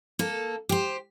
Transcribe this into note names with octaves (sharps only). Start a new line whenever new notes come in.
A#3 A4
G4 C5